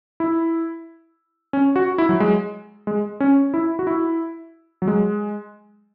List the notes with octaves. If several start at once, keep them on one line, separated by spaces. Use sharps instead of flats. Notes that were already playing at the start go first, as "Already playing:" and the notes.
E4
C#4
F#4
E4
F#3
G#3
G#3
C#4
E4
F#4
E4
F#3
G#3